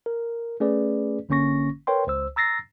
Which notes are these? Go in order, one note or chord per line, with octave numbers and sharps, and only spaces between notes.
A#4
A3 C#4 G#4 B4 D5
G1 D3 A#3 C#4 C#6 A#6
A#4 B4 C#5 G5 C6
C#2 C5 E6
A#5 E6 A6 A#6 C7